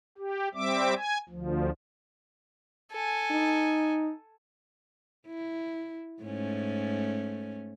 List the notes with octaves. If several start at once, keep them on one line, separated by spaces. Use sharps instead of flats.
G4
G3 C4 E5 D6
G#5
D2 F3
A4 G#5
D#4
E4
G#2 A3 C#4